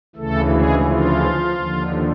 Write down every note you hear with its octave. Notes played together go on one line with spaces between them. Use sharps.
D2 C#3 E3 A3 A4
G#3 G#4
F3 F4
D#2 D3 F3